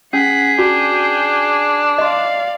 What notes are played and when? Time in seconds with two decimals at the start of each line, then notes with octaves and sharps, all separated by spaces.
0.13 C#4 G#4 F#5 B6
0.59 D4 F#4 G5
1.98 D5 D#5 F5 C6